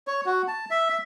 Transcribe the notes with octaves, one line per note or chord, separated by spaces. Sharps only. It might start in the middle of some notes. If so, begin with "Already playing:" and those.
C#5
F#4
A5
E5
E5